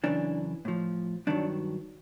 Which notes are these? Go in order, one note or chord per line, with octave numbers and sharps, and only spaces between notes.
F#2 C#3 E3 D4
A2 F3
G2 D#3 F#3 D4